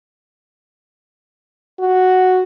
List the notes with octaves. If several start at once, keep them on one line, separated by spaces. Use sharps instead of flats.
F#4